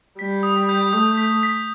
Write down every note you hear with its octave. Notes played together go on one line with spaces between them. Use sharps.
G3 B6
D#6
G6
A3 D#6
B6
B6